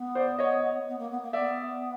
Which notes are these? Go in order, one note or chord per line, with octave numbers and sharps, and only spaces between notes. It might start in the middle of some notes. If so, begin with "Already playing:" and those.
Already playing: B3
C5 D5
C#5 D#5
B3
A#3
B3
A#3
B3 D5 E5